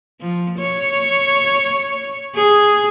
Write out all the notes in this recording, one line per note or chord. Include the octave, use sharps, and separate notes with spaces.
F3
C#5
G#4